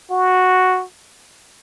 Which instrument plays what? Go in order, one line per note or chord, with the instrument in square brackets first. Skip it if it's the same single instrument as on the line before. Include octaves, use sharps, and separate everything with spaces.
[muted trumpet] F#4